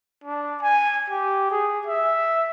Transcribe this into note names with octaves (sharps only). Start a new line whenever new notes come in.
D4
G#5
G4
G#4
E5